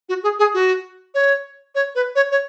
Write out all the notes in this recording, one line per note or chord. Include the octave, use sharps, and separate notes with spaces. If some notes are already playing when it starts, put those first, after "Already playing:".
F#4
G#4
G#4
F#4
C#5
C#5
B4
C#5
C#5